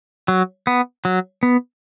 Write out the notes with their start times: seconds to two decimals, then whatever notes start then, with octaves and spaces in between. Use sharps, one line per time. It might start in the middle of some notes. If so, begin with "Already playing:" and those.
0.28 F#3
0.67 B3
1.05 F#3
1.43 B3